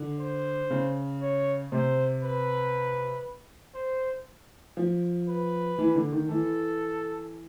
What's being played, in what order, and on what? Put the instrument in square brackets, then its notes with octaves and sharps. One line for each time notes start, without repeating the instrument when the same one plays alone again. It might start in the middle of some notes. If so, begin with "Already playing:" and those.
Already playing: [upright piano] D3
[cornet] C5
[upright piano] C#3
[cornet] C#5
[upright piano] C3 [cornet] C5
[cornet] B4
C5
[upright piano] F3
[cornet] B4
[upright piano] E3
D3
D#3
[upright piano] E3 [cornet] A4